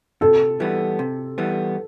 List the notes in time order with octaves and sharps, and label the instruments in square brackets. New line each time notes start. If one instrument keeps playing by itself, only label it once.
[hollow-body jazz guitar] C3 [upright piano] A4
[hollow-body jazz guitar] E3 G3 B3
C3
E3 G3 B3